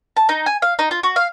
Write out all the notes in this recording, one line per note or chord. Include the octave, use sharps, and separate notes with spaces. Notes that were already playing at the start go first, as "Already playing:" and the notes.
A5
D#4
G#5
F5
D#4
F4
F#4
F5